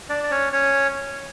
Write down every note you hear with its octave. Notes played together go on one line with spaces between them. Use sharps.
D4 D5
D5
C#4 C#5
C#4 C#5